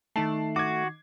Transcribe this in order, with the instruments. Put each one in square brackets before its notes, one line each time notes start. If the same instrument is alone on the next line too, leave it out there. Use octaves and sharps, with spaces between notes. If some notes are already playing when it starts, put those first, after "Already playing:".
[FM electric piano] D#3 D#4 C7 [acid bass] A3 [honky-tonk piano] A5
[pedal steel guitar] F#4 [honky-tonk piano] D6 G#6